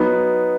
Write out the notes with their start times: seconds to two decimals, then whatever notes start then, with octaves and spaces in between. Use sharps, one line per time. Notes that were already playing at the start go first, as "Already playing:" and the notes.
Already playing: F#3 B3 D#4